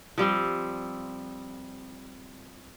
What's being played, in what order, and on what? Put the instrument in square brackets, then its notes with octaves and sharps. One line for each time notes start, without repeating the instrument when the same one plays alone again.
[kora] F3 G3 C4